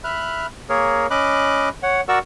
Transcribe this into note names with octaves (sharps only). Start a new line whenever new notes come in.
E5 B5 F6 F#6
A#3 G#4 A#4 C#5
C#4 D#5 B5 D6 F#6
C#5 F#5
F#4 A#4 D5 F#5 C#6 E6